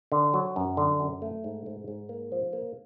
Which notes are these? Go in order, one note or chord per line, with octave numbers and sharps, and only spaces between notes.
D3
F#3
F#2
D3
F#2
A3
G#2
G#2
G#2
A#3
F3
A#3